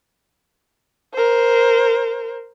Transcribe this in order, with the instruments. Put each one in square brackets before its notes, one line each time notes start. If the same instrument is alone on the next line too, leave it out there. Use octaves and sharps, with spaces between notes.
[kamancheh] A#4 C5